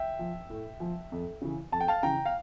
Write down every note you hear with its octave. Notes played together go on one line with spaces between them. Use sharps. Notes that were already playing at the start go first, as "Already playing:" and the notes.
Already playing: E5 G5
F3
A2
F3
F2
C#3 E3
F2 A5
G5
F5 A5
C#3 E3 G5 A#5
F5